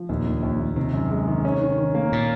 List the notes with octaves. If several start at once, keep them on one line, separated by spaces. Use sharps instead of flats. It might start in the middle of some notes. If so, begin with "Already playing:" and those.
Already playing: F3
D#2 A#2
D#2
D#2
D#2
C3 D#3
F#2
G#3
D#3
C#4
D#3
D#3
A#3
A#2